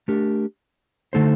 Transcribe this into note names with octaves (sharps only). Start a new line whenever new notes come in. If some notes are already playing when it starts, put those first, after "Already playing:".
A3 D4 G4 A#4
D3 A3 D#4 A4 C5